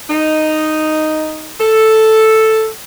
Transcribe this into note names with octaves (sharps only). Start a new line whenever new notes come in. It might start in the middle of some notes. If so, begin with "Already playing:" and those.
D#4
A4